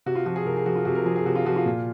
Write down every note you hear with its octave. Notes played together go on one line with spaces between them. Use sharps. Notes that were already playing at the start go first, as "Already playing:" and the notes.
C3 F#4
F4
F3 F#4
G#4
C3 A#4
G#4
F3 F#4
F4
C3 F#4
A#4
F3 G#4
G#4
C3 F#4
F4
F3 F#4
F4
A#2